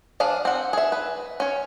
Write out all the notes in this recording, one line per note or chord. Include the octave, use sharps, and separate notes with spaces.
F3 D4 G#4 F5
C4 F#5
G#4 E5
B4
C#4 C#5